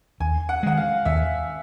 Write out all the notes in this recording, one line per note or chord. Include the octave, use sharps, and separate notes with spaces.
D#2 G#5
F#5
D#3 G#3 F#5
F5
D#2 E5